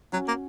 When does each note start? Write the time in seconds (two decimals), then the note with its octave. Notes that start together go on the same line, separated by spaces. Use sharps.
0.12 F#3 C#4 F#4
0.28 A#3